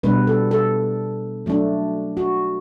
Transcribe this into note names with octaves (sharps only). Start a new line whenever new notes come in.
B2 G3 B3 D4 B4
A4
A4
F#3 A3 D4
F#4